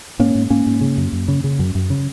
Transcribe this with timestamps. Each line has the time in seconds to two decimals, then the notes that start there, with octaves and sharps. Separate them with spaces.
0.19 G#2 A#3 C#4
0.35 G#2
0.50 G#2 A#3 C#4
0.66 G#2
0.81 C#3
0.97 F#2
1.13 F#2
1.28 C#3
1.44 C#3
1.59 F#2
1.75 F#2
1.90 C#3